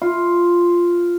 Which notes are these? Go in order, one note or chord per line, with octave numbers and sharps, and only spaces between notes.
F4